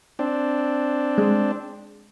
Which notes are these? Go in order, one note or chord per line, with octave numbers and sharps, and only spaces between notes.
C4 D4
G#3